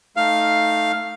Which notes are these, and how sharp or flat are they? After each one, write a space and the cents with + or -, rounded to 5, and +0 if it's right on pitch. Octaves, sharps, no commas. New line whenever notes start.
A3 +0 D#4 +0 F5 +0